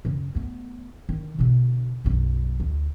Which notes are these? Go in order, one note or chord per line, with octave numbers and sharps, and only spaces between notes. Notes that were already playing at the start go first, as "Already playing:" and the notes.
F#2 C#3
A3 B3
D3 D#3
B2 D3
B1 F#2
D2